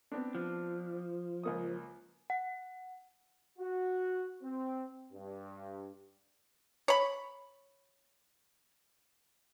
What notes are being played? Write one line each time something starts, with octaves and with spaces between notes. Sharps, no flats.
B3 C4 D4
F3
C#2 A#3 D#6
F#5
F#4
C4
G2
C#5 B5